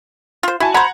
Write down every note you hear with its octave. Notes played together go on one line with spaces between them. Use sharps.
F4 C5
E4 F#4 G#5 A5
C5 F#5 A#5 B5 G#6